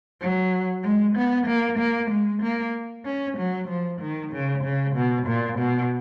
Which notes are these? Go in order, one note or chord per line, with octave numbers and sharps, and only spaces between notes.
F#3
G#3
B3
A#3
A#3
G#3
A#3
C#4
F#3
F3
D#3
C#3
C#3
B2
A#2
B2